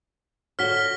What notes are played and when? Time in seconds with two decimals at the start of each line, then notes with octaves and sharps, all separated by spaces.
0.59 D3 F#4 C#5 F6 B6 G7
0.76 A#6